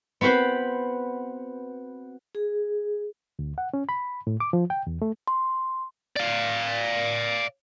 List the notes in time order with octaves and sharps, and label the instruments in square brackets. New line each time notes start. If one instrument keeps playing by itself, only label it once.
[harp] B3 C4 F#4 B4 C5
[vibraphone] G#4
[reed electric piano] D2
F#5
C#4
B5
A2
D6
F3
G5
E2
A3
[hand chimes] C6
[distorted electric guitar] D5 F5